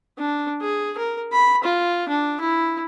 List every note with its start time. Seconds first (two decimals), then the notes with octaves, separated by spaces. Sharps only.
0.19 D4
0.61 G#4
0.98 A#4
1.32 B5
1.64 F4
2.09 D4
2.41 E4